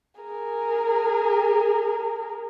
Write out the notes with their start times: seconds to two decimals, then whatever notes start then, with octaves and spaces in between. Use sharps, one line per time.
0.21 G#4 A#4